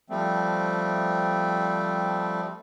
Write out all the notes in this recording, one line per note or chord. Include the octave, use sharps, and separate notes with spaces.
F3 G3 A3 C4